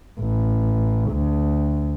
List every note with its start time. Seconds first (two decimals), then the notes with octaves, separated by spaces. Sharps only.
0.19 A1
1.11 D2